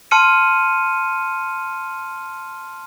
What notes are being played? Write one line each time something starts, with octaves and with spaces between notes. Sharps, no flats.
A5 C6 F6 C#7 D#7